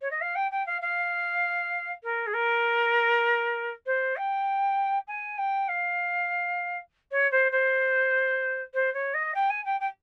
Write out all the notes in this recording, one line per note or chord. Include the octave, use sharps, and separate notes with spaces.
C#5
D#5
F5
G5
G5
F5
F5
A#4
G#4
A#4
C5
G5
G#5
G5
F5
C#5
C5
C5
C5
C#5
D#5
G5
G#5
G5
G5